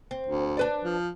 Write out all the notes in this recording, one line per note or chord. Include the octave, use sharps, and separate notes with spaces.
C4
D2
D4 B4 D5
F3